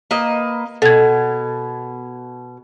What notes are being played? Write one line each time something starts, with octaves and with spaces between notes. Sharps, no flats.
A#3 B4 D#5
B2 A4 G#6